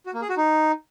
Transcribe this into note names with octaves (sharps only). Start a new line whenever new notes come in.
F#4
A#3
G#4
F#4
D#4